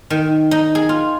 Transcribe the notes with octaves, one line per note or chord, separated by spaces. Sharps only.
D#3
D#4
G#4
F4